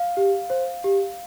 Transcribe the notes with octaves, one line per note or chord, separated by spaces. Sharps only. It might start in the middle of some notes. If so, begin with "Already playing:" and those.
Already playing: F5
G4
C5
G4